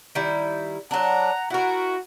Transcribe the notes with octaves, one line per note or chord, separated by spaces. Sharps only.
D#3 G3 E4
F#3 D4 F#5 A#5
E4 F#4 A#4